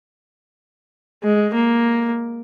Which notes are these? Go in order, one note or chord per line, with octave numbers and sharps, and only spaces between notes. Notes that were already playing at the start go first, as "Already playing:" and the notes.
G#3
A#3